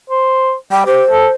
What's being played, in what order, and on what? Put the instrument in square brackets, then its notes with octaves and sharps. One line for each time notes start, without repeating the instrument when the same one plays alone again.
[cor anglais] C5
[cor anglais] G3 [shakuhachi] G5
[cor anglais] G4 [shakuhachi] C5
[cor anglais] A4